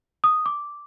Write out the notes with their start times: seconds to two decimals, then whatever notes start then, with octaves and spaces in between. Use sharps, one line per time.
0.24 D#6
0.46 D6